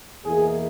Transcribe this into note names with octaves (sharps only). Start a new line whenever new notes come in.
E2 B2 A#3 E4 G#4